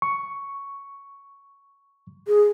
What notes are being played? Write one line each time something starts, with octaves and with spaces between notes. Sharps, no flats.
C#6
G#4